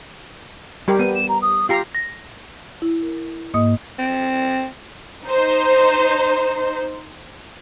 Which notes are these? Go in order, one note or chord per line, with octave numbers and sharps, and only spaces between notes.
G3 G4 A#4 G5
B3 D#7
E7
A#5
D#6
F4 G4 A#5 C7
A#6
E4
A#4
G#2 A#3 D#5 D#6
C4
D#4 C5